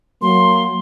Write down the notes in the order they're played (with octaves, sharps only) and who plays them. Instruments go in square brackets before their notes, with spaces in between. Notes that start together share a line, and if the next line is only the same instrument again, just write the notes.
[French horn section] F#3 A#3 [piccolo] C6